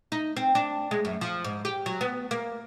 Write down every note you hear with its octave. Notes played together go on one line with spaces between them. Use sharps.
D#4
C4
D4
G#3
F#2
F3
G#2
G4
F#3
B3
A#3